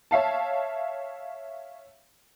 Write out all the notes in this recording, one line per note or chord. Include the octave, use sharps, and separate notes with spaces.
C#5 E5 F5 A5